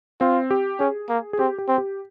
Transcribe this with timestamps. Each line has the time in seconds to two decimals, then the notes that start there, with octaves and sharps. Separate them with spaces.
0.21 C4 F4
0.51 G4
0.80 C#4 G#4
1.09 A#3
1.33 G#4
1.39 C4 G4
1.58 G4
1.68 C4
1.78 G4